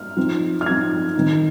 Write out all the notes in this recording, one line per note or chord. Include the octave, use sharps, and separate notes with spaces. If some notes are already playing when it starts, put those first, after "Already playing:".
Already playing: F6
F3 C4 D#4
F6
F3 C4 D#4 G#6
D#3 C4 D#4